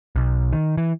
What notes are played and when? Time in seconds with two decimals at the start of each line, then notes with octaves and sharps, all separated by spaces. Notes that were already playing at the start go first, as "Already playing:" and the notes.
0.16 B1
0.53 D#3
0.78 E3